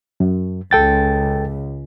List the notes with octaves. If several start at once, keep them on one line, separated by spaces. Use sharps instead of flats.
F#2
C#2 A4 G5 A6